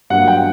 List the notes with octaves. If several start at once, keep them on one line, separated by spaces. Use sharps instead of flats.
G2 F#3 A#3 F#5
G5